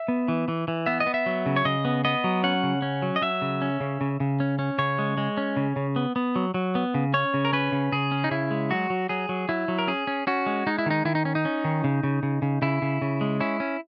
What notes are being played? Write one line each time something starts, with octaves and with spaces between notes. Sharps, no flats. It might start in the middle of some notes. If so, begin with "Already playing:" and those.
Already playing: E5
B3
E3
E3
E3
B3 E5
D#5
B3
E5
F#3
C#3
C#5
C#3 D#5
B3
B3 D#5
F#3
C#4 F#5
C#3
C#4
F#3
D#5
F#3 E5
C#3
C#4
C#3
C#3
C#3
C#4
C#4
C#3 C#5
G#3
G#3
C#4
C#3
C#3
B3
B3
F#3
F#3
B3
C#3
C#4 C#5
C#3
A#4
C#4 B4
C#3
C#3 G#4
C#4
D#4
C#3 E4
G#3
F#3 F#4
F#3
F#3 G#4
F#3
F#3 E4
F#3
A#4
C#4 G#4
C#4
C#4 F#4
G#3
G#3 D#4
E4
D#3 D#4
D#3 E4
D#4
C#4
D#4
C#4
D#3
C#3
C#3
C#3
C#3
C#3 E4
C#3
C#3
G#3
C#4 E4
C#4